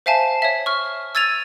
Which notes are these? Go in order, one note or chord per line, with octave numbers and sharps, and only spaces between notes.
C5 E5 F5 G#5 A5
C#5 E5
C#6 F6
E6 G#6 A6 D#7 F7